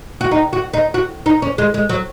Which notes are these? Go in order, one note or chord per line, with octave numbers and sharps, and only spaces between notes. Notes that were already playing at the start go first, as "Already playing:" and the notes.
F#4
D#4
F#4
D#4
F#4
D#4
C#4
G#3
G#3
F#3